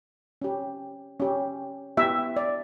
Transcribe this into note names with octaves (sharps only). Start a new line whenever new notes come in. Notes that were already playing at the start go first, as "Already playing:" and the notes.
C#4 G4
C#4 G4
B3 E4 G4 E5
D5